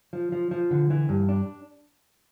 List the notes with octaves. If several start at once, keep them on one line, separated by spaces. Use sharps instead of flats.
F3
F3
F3
D3
E3
G2
D4